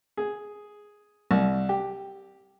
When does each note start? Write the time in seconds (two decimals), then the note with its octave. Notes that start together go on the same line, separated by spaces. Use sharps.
0.17 G#4
1.31 C2
1.69 G4